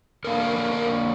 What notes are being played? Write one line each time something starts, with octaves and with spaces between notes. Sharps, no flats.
D3 A#3 D4 A#4
A#4
A#4
A#4